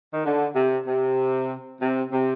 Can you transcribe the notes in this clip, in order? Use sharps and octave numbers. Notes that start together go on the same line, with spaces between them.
D#3
D3
C3
C3
C3
C3